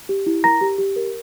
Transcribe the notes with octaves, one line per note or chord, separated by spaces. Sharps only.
G4
E4
A#4 A#5 A#6
G4
G4
A#4